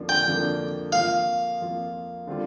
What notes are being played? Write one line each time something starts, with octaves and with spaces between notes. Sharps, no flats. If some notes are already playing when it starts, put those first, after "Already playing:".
Already playing: F2 D3 F3 A#3 D4
G5
F2 D3 F3 A#3 D4
F2 F3 A#3 F4 F5
F2 F3 A#3 F4
D3 G3 C4 F4